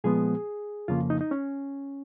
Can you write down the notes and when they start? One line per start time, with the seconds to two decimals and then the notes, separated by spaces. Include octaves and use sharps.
0.04 A#2 F3 G#3 B3 G#4
0.88 F2 C#3 F3 A#3 F4
1.10 D#4
1.21 D#4
1.31 C#4